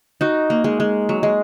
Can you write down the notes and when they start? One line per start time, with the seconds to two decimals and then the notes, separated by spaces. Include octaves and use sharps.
0.21 D#4 F#4
0.50 A#3
0.64 G#3
0.80 G#3
1.09 F#3
1.23 G#3